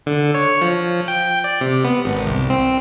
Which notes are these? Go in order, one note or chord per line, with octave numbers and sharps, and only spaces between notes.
D3
C#5
F3
G5
D5
C3
B3
G#1
C2
C4